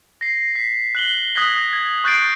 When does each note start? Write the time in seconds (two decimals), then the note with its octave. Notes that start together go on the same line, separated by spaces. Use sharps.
0.21 A#6 C7
0.55 B6
0.95 F#6 F#7 G7
1.35 D#6 F#6 G#6 A#6 B6 F#7
1.73 G#6
2.04 C#6 F#6 G6 A6 C7 D7